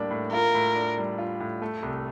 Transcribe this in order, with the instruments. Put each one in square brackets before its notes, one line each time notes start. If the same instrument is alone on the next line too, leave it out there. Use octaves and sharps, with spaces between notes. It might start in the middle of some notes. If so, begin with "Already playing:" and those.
Already playing: [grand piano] A2 G3 A#3 D4
A2
[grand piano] F4 [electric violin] A#4
[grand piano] A2
D4
G3
F4
A2
A3
C2